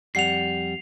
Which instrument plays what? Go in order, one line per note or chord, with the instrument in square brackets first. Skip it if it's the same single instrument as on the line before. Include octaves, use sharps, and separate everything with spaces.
[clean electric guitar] F2 G3 F#5 [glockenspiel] C7 F7